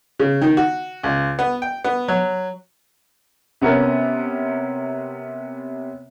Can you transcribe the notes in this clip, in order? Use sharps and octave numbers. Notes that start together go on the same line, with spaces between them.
C#3
D#3
F#4
C#2
B3
G5
B3
F#3
C3 B3 C#4 A#4